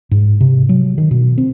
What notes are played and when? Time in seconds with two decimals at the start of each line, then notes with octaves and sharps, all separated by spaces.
0.11 G#2
0.41 C3
0.69 F#3
0.98 D#3
1.11 B2
1.38 C4